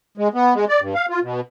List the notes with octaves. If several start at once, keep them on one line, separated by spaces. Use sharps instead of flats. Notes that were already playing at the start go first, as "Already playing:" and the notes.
G#3
B3
G#3
D5
G2
F5
F4
B2